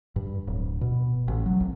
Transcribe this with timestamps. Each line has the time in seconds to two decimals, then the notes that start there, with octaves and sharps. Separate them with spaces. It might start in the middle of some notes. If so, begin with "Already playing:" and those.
0.16 G2
0.47 D1
0.81 B2
1.28 A1
1.46 F#3
1.60 C2